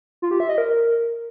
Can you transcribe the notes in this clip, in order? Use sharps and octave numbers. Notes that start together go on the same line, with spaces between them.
F4
G4
E5
D#5
A#4